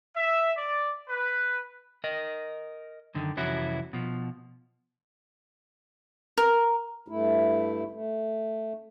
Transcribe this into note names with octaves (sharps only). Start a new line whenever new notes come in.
E5
D5
B4
A#4 D#5
F#2 D3 D#3
C2 F2 E3 C#4 E4 F#4
B2 F3
A#4
G2 A3 E4
A3